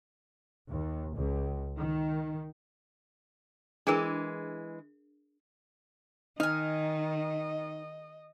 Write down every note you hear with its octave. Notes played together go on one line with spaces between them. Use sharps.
D#2
C#2
D#3
E3 G#3 D4 G#4 A#4
D#3 D#4 D#5 G#5 F6